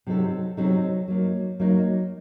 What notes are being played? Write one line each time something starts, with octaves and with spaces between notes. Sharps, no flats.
C3 F#3 C4 D#4 A4
C3 F#3 C4 D#4 A4
F#3 A#3 D#4
F#3 A#3 D#4